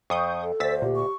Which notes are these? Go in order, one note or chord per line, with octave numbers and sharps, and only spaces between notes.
F2 C#6 D#6 G6
A4
D2 C5 E6 A6 B6
A#2 G4
C#6